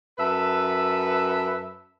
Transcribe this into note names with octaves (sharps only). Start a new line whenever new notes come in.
F#2 A4 B4 E5